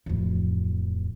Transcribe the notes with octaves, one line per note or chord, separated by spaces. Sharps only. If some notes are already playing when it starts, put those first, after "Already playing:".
D1 F2